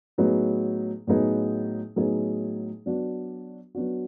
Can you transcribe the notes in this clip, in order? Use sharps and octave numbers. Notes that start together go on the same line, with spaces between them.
A2 F#3 B3 D#4 G#4
A2 F#3 B3 D#4 G#4
A2 F#3 B3 D#4 G#4
F#3 B3 D4 F#4
F#3 B3 D4 F#4